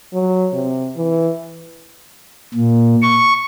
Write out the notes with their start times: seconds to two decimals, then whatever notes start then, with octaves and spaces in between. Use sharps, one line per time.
0.14 F#3
0.53 C3
0.97 E3
2.54 A#2
3.03 C#6